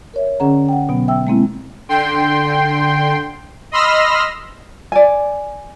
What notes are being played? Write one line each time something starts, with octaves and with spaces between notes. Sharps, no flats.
A#4 C#5 E5
D3 C#4 G#4 F#5 A#5
F#5 G5
B2 F#3 B3
E5 G5 E6
G#3 A#3 C4 E4
D3 G5 C6
D#5 B5 C6 E6 F6 A#6
D5 G#5